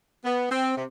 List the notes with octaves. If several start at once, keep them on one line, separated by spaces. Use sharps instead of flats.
B3
C4
C3